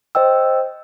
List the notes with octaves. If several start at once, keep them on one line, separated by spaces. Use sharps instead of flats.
C5 D#5 G5 E6